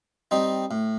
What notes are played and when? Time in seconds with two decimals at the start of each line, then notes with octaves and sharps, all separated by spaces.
0.31 G3 C4 D#4
0.71 A2